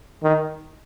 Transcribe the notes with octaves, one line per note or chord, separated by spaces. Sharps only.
D#3